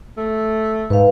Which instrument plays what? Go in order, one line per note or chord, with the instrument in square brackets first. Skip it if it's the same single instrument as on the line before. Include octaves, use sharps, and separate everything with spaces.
[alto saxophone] A3
[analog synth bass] G#2 [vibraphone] B4 F5